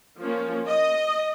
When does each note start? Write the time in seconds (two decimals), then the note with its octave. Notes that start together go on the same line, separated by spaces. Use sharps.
0.20 F3 A#3 C#4
0.68 D#5